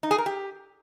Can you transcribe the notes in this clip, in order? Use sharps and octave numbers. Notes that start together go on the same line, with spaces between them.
D#4
G#4
A#4
G4